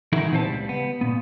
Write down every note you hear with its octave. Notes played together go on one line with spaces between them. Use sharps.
E3 D#4 E4 F#4 G#4 A#4
A#2 B3 C4 D4 C5 A5
C#2 G3
B3
A#2 B3